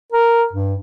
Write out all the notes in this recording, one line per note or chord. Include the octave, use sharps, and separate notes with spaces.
A#4
G2